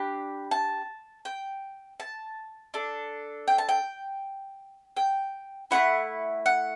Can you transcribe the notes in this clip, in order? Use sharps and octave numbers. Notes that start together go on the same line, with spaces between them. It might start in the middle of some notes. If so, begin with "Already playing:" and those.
Already playing: D4 G4 B5
A5
G5
A5
D4 A4
G5
A5
G5
G5
A3 C4 E4 F#5
F#5